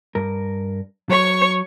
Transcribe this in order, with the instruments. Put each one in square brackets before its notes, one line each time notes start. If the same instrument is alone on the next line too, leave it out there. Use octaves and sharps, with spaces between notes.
[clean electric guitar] G2 A#4
[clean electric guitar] F#3 [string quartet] C#5 C#6